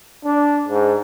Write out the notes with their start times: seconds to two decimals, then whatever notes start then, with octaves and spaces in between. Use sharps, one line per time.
0.25 D4
0.68 G#2